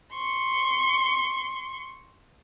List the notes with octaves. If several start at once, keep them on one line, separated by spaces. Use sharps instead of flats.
C6 C#6